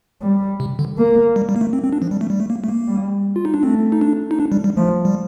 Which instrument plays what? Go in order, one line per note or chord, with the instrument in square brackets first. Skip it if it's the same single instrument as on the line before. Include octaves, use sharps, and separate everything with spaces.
[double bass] G3
[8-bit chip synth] C3
D3
[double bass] A#3
[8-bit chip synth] G3
G3
A#3
A3
C4
C4
D4
F3
G3
A3
G3
A3
A#3
A3
A#3
[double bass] G3
[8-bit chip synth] F4
D#4
D4
[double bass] A3 [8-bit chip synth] C4
[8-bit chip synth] D#4
D4
D#4
D4
G3
G3
[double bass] F3 [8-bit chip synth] A3
[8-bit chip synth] G3